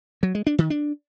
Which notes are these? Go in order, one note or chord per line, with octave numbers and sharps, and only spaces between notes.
F#3
G#3
D4
D#3
D4